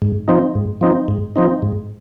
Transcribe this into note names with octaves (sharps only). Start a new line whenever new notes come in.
G#2
F3 C4 D#4
G#2
F3 C4 D#4
G#2
F3 C4 D#4
G#2